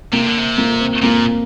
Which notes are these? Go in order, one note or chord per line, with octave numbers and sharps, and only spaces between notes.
C3 A#3
D3
C3
A#3
C4
A#2 A#3